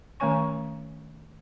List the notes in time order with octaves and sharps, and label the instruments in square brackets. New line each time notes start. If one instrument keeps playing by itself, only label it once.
[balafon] D#3 A3 C#4 C#5 G#5 C#6